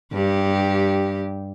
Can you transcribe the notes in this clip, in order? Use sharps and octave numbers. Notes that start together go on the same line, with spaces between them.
G2 G4